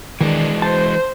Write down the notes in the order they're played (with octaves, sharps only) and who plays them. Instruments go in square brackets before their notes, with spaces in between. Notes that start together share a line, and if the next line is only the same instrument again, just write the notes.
[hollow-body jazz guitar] D#3 [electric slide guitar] E3 G#3 [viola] D4
[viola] C5 [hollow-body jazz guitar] A5